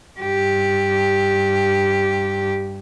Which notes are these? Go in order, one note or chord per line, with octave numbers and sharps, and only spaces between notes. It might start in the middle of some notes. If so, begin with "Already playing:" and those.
G2 G4